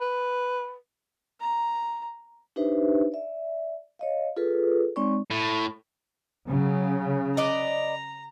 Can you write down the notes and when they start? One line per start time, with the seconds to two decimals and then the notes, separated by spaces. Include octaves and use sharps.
0.01 B4
1.40 A#5
2.56 D4 D#4 G4 B4 C5 E5
3.12 D5 E5
3.99 C#5 D#5 F5
4.37 F4 G#4 A4 B4
4.96 G#3 C4 D#4 C#5 D5 C#6
5.31 A2
6.49 C#3 F#3
7.37 B4 D5 D#5 A#5